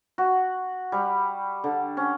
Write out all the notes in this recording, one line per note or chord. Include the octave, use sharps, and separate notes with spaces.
F#4
G3
D3
C#4